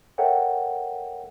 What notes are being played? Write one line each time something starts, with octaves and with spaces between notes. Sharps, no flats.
A4 A#4 C#5 E5 F#5 G5